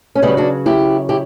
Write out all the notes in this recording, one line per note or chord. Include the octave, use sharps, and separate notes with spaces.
C#4
C#3 F#3 G3 B3
D4 F#4
E4 G4
E4 G4